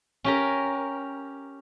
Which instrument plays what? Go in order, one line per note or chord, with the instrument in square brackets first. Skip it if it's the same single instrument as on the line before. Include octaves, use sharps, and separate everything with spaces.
[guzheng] C#4 G4 A#4